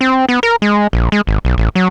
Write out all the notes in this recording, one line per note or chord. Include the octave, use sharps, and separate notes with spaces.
C4
B3
A#4
G#3
A#1
G#3
G#1
B1
A1
F#3